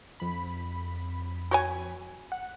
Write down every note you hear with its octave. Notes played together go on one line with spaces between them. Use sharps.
F2 B5
F#4 C#5 G#5
F#5